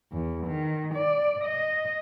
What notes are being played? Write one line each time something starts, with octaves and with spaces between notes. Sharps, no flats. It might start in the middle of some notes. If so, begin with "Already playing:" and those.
E2
D#3
D5
D#5